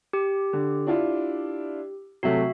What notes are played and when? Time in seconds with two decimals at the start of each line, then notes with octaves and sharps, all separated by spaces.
0.13 G4
0.53 D3
0.87 D4 E4 F4
2.23 C3 F#3 A3 F#4 E5